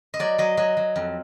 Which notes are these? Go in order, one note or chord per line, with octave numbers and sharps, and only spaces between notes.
D#5
F#3 D5
F#3 D#5
F#3 D#5
F#3
F2